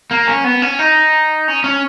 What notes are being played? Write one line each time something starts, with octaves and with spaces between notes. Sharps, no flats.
A#3
C#4
B3
C#4
D#4
C#4
C#4